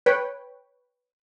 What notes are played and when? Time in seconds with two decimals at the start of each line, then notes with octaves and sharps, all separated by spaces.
0.06 B4 C#5 G5